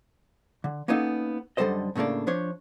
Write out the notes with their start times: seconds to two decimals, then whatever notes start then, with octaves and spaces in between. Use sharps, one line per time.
0.64 D3
0.88 A#3 B3 C#4 D#4 G4 A4
1.57 F#2 D3 G3 A4 C5 D#5
1.95 A2 C#3 A3 A#3 D4
2.27 F3 D4 C5 C#5